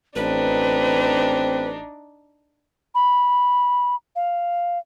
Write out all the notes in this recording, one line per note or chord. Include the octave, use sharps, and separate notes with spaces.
A1 C4 D4 D#4 B4
B5
F5